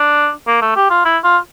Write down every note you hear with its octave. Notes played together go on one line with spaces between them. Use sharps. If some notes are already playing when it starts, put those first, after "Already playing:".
Already playing: D4
A#3
A3
G4
F4
E4
F4